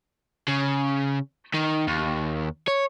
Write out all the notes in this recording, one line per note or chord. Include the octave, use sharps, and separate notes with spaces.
C#3
D#3
D#2
C#5